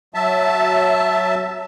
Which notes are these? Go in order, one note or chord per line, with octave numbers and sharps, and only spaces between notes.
F#3 E5 A5